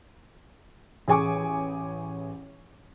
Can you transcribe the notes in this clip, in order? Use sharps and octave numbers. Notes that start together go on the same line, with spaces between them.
A1 G#4 G#5 C#6 D6